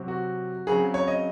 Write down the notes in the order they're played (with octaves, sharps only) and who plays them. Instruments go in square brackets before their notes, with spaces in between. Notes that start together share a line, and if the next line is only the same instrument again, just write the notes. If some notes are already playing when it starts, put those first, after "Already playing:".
Already playing: [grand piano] C3 F#3 C4
F#4
C#3 F#3 C4 G#4
C#5
D#5